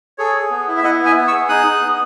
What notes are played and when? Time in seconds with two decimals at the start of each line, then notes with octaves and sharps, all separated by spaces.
0.18 G#4 A4 C#5
0.36 G#4
0.51 B3
0.68 E4
0.77 E5
0.83 E4 D#5 F#5
1.00 B3
1.05 E5 G#5
1.16 B3
1.28 C#6 E6
1.32 G#4
1.49 D#4 D#6 F#6
1.66 D#4
1.82 B3